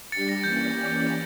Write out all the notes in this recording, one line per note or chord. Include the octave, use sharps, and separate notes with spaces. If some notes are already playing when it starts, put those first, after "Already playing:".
G3 D4 G4 A6 C#7
A#6
E3 A#3 C#4 G4 D5 G6